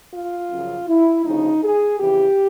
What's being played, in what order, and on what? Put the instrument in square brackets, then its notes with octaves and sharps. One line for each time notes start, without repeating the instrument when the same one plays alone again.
[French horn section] F4
F#2 C#3 F3
E4
D2 C#3 F3 D#4
G#4
F2 C#3 E3 G4